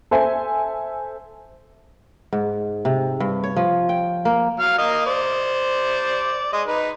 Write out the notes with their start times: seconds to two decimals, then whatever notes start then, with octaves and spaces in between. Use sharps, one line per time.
0.11 A4 C5 E5 G#5
2.33 G#2
2.85 C3
3.20 G2
3.44 C#5
3.57 F3
3.89 G5
4.25 A#3
4.60 F#3 F5 F6
4.78 A#3 D#5 F5
5.06 C5 D5
6.53 G#3 D#5
6.67 D#4 B4